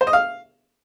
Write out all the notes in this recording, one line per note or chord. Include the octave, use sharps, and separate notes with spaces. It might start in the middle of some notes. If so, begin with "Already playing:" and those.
C5
D#5
F5